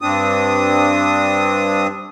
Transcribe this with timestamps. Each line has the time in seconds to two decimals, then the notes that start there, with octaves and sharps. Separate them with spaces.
0.01 G2 C4 D4 D#6